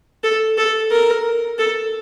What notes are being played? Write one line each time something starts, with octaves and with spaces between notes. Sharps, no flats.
A4
A4
A#4
A4